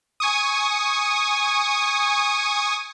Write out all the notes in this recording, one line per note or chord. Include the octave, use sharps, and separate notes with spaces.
G#5 C#6 D#6